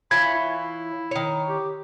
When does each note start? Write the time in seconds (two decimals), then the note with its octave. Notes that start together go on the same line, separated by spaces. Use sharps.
0.11 E3 F4 C#5 B5 G#6
0.35 E4
1.11 D#3 C#5
1.49 G4